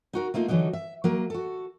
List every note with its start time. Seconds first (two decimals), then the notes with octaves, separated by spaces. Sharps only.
0.13 D#4 F#4 A#4
0.34 A3 A#3 D#4 F4
0.48 D3 E3 F#3 D#4 F#4
0.73 E5
1.04 F#3 A#3 A#4
1.30 F#4 A4